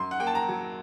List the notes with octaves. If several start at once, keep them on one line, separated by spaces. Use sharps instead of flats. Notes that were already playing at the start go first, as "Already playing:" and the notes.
Already playing: F#2 C6
F#5
A#3 G5
A5
A#5
F#3